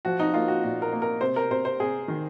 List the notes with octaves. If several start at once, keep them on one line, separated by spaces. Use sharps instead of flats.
F3 F#4
D#4
A#3 F4
F#4
A#2 F#4
A#4
A#3
A#4
C3 C5
A#4
C3 C5
C5
C3 G#4
D#3